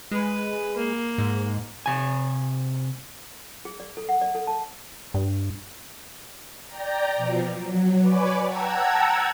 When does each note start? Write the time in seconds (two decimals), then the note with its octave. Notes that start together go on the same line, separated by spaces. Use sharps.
0.11 G#3 B4
0.77 A#3
1.18 G#2
1.86 C3 G#5
3.65 G#4
3.80 D5
3.97 A4
4.09 F#5
4.21 D5
4.35 A4
4.47 A5
5.14 G2
6.67 D5 G5 A#5
7.16 B2 F3
7.52 F#3
8.00 B4 C#5 D5 G#5 B5 D6
8.42 F#5 G5 A5 A#5 E6 G#6